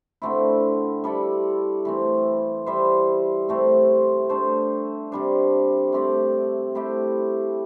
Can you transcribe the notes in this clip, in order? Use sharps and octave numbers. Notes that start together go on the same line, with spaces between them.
D3 A3 C4 E4
G3 E4 A4 D5
E3 A3 C4
G3 E4 C5 E5
C3 A3 C4
A3 D4 C5
C3 G3 D4
A3 C4 G4 D5
C3 A3 E4 G4